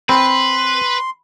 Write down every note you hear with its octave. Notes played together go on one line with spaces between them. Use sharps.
C4 B4 B5 C6